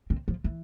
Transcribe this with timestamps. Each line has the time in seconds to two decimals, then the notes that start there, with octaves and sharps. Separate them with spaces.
0.10 C4
0.28 F3
0.44 E3